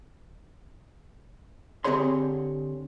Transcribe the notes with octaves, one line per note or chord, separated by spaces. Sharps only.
D3 C4 G4 G#4 C#5 C6